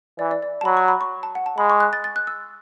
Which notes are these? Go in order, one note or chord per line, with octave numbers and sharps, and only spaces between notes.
E3 D5
D5
D5
A5
F#3 B5
C#6
B5
C#6
A5
F#5
A5
G#3 B5
C#6
F#6
A6
A6
F#6
E6